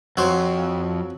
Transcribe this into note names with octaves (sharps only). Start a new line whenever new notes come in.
F2 F#3 C5